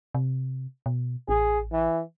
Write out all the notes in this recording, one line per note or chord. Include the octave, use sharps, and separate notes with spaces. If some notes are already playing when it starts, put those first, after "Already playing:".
C3
B2
A1 G#4
E3